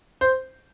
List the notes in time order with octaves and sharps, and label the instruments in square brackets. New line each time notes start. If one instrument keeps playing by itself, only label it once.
[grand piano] C5